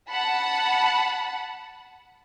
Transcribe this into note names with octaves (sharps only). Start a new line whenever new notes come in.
F#5 A5 B5